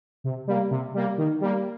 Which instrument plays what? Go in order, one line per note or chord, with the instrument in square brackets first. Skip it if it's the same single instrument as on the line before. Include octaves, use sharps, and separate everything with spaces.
[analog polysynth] C3
G3 A#3
C3
G3 A#3
D#3
G3 A#3